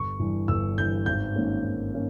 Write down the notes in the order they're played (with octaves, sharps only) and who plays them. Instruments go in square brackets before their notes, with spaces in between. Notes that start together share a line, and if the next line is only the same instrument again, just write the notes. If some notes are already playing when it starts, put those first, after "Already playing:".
Already playing: [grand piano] G1 C#6
G2 E3
G1 E6
G2 E3 G6
G#1 G6
G#2 D#3 A#3 C#4
G#1
D#3 A#3 C#4